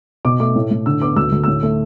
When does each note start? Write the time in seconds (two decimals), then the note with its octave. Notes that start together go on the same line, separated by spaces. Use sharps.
0.25 B2 D6
0.40 A3 D6
0.56 A2
0.71 A2
0.86 D3 E6
1.01 B3 D6
1.16 D2 E6
1.32 D2
1.44 A2 E6
1.63 A3